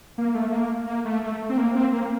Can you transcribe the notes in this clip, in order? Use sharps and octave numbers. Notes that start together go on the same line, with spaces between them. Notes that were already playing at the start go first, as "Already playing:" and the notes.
A#3
A3
A#3
A#3
A3
A3
C4
A#3
C4
A#3